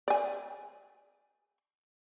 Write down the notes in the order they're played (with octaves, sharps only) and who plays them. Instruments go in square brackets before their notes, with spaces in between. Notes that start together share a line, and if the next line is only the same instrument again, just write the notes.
[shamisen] D5 G#5